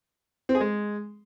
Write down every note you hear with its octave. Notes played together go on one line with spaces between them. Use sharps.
C4
G#4
G#3